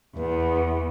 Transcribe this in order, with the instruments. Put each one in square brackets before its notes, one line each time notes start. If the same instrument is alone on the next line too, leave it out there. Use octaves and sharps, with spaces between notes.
[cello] E2 [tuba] B3